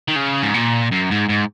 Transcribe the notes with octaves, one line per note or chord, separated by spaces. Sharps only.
D#3
C#3
G#2
A#2
F#2
G#2
G#2